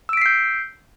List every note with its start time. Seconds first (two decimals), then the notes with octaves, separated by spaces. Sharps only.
0.09 E6
0.13 D7
0.17 B6
0.22 C7
0.26 G6